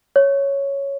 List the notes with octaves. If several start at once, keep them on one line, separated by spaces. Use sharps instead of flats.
C#5